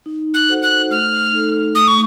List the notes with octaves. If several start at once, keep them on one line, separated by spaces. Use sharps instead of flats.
D#4
F#6
F#4 A4 C5 F#5
F#6
A3 F6
D#4 A4
A3 D#6
C#6